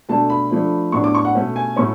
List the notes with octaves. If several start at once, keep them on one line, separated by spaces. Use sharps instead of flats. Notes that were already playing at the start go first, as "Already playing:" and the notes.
B2 A3 D4 A5
B5
F3 A3 D4
A2 F#3 B3 D4 C#6
D6
C#6
F#5
B2 A3 C#4
G#5
A2 F#3 A3 C#4 C#6